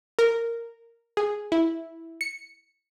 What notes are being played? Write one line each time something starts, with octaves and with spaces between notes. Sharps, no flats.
A#4
G#4
E4
C#7